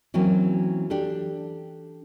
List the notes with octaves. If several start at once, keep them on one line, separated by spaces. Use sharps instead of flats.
E3 F#3 A#3 C4 C#4
D4 G4 A4